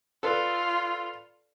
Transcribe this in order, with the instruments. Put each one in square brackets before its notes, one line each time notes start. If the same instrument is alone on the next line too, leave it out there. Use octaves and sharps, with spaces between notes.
[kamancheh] F4 [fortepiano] A4 B4 D5